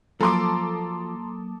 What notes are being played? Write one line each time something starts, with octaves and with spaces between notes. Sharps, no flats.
F3 F#3 A#3 A4 A#5 C6 D6 D#6